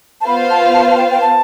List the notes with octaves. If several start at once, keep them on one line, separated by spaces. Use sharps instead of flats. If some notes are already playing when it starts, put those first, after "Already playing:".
A5
B3 F4 C5 F5 B5
A5
A5
A5
G5
G5
A5